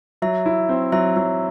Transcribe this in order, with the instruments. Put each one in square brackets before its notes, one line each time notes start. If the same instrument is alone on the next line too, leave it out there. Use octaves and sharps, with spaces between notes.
[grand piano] F#3 [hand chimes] E5
[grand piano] E4
C4
[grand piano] F#3 [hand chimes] E5
[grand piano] F#3